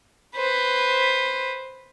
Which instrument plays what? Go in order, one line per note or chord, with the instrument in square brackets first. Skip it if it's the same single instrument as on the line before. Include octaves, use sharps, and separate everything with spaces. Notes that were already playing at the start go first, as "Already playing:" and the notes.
[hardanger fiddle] B4 C5